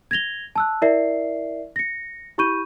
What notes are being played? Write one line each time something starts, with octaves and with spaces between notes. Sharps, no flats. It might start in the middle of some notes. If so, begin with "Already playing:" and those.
G#6 A#6 F7 G7
A5 E6 F#6
E4 A#4 D5 E5 C7
A#6 C#7
E4 G4 B5 C#6 G6 D#7